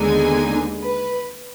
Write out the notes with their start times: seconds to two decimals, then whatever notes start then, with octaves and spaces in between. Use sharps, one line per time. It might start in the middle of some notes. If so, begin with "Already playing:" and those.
Already playing: D#2 D3 G#3 B3 D#4 G#5
0.83 B4